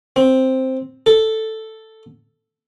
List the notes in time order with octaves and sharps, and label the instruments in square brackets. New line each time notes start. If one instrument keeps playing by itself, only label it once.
[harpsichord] C4
A4